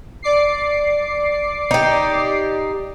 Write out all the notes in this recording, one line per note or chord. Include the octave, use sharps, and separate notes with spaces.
D5 D6 C7
D#4 G4